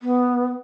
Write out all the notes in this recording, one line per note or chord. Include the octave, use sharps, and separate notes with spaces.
B3